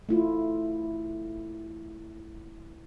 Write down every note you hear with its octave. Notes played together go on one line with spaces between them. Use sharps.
A3 E4 F4